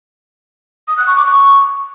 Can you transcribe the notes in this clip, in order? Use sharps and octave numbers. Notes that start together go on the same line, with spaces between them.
D#6
F#6
C#6
D6
C#6